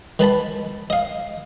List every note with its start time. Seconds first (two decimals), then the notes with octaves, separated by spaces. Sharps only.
0.19 D#3 B4 A5 B5
0.90 D#5 F5